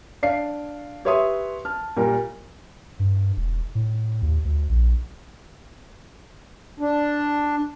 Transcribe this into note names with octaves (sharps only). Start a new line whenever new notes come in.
D4 D5 F5 C7
G4 B4 C#5 E5 C6 D#6
A5 F6
A#2 G3 A#4
G2
E1
A2
D#2
D2
A#1
D4